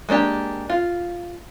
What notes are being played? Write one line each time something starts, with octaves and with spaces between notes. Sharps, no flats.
G#3 A#3 D4 G4
F4